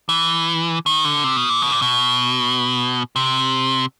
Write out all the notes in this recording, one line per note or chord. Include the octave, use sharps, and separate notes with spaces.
E3
D#3
D3
C3
B2
A#2
B2
A#2
B2
C3